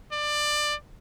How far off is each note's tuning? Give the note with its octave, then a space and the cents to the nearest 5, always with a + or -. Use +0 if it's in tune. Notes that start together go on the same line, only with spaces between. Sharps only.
D5 +20